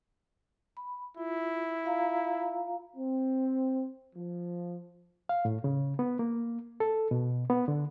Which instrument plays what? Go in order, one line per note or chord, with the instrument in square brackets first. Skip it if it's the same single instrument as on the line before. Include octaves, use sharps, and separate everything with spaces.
[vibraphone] B5
[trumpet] E4 [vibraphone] F4
[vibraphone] F4 F5 A#5
[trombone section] C4
F3
[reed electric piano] F5
A2
C#3
B3
A#3
A4
B2
B3
D3